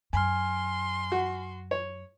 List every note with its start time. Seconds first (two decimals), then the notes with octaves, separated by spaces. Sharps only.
0.13 F#2 G#5 C6 F6
1.12 F#4
1.71 C#5